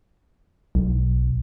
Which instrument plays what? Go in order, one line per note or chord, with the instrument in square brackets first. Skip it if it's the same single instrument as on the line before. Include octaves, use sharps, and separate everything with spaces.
[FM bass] B1